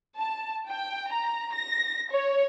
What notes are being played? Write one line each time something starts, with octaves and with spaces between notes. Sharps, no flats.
A5
G5
A#5
A#6
C#5